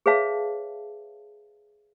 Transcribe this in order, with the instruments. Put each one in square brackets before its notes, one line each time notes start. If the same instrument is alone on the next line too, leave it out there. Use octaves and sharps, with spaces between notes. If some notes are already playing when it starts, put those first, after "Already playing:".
[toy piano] G#4 B4 C#5 E5 F5 A5